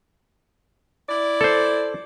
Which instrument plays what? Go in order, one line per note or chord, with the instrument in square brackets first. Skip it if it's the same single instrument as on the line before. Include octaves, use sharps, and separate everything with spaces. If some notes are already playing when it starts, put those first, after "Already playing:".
[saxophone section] E4 D5
[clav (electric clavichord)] A4 C5